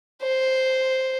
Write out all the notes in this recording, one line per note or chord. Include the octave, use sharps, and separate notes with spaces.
C5